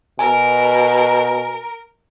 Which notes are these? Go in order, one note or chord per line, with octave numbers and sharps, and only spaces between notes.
B2 A#4 G#5